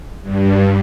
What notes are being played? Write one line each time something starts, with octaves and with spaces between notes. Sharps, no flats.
G2